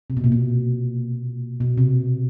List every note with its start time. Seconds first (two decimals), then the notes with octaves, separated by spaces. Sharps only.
0.10 C3
0.17 B2
0.24 A#2
0.32 B2
1.60 B2
1.78 C3